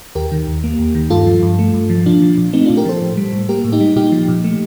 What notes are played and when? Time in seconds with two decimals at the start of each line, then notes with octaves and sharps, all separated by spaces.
0.15 D#2 G4 A#4
0.32 D#3
0.48 D#2
0.64 A#3
0.79 D#2
0.95 D#3
1.10 G2 F4 A4
1.27 F3
1.43 G2
1.59 A3
1.74 G2
1.90 F3
2.06 A#2 D4 F4
2.22 F3
2.38 A#2
2.53 A3 C4 D#4
2.65 A#2 D4 F4
2.77 G4 A#4
2.85 F3 A4 C5
3.01 A2
3.17 G3
3.33 A2
3.49 A#3 G4 A#4
3.64 A2
3.72 D#4 G4
3.81 G3
3.96 A#2 D#4 G4
4.12 F3
4.28 A#2
4.44 A3